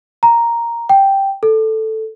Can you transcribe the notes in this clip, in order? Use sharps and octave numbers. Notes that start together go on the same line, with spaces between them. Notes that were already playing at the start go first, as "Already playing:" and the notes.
A#5
G5
A4